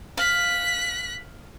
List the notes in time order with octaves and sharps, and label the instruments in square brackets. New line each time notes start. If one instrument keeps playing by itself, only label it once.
[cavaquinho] F5 [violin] F#6 B6